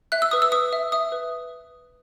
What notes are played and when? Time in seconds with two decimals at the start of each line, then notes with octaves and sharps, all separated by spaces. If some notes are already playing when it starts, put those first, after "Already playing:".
0.12 E5 F#6
0.22 E6
0.31 B4 D#6
0.42 E6
0.52 B4 D#6
0.73 E5
0.92 E5 D#6
1.12 B4